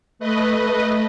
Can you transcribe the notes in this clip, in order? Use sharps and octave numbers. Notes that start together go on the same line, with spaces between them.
A3 B4 D#5